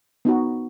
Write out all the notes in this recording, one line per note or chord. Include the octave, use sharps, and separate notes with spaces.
B3 D#4 F#4